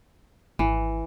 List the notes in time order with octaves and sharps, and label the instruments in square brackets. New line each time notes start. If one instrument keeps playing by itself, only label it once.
[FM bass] G#1 [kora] E3